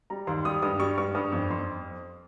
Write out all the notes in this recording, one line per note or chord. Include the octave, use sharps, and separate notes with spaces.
G3 A#5
D#2 C6
G3 D#6
G2 D#6
G3 C#6
G2 C#6
G2 D#6
F2 C#6
F2 C6